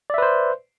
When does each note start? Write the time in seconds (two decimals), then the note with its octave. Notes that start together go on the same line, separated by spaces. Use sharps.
0.10 D5
0.14 E5
0.18 B4
0.22 C5